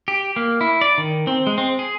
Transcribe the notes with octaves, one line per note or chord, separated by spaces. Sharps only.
G4
A#3
E4
D5
D#3
C4
G#3
C4
G#4